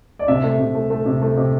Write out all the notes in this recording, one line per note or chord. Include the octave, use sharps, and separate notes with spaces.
D5
C3 E5
A3
C3
A3
A3
C3
A3
C3